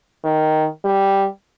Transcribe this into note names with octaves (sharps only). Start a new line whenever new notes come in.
D#3
G3